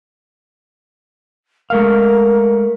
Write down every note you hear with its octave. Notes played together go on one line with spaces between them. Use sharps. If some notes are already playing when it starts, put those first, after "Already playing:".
G#3 A3 A#4 F5